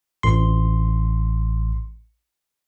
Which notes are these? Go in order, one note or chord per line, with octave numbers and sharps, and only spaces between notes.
A1 C6